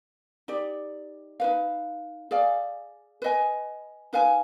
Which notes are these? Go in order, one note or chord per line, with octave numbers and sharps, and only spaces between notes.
D#4 G4 D5
D#4 B4 F5
G#4 D5 F5
B4 D#5 G#5
D#4 B4 F5 G#5